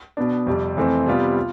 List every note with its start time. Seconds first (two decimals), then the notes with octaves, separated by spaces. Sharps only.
0.17 B2 B3 D4
0.47 F2 C3 G3
0.77 F2 E3 A3 C4
1.06 C3 G3 B3 F4
1.37 F4